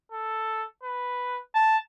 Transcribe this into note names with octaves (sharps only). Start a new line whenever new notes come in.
A4
B4
A5